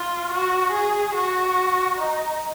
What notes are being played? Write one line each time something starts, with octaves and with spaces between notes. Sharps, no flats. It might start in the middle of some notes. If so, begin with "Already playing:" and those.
Already playing: F4
F#4
G#4
F#4
D#4